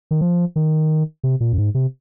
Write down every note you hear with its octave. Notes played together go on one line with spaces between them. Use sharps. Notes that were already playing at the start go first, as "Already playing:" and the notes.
D#3
F3
D#3
C3
A#2
F#2
G#2
C3